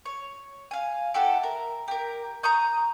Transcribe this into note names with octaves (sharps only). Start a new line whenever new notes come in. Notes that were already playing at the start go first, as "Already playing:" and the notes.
C#5
F5 G#5
E4 G4 A4 F#5
A#4
G4 A#4
A#5 C#6 D#6 G6